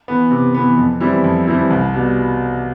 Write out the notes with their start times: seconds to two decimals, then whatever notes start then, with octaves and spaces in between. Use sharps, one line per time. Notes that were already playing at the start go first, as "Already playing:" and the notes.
0.08 E3 B3
0.31 C3
0.54 E3 B3
0.78 F2
1.00 E3 G3 C4 E4
1.24 F2
1.47 E3 G3 C4 E4
1.70 C2
1.94 B2 G3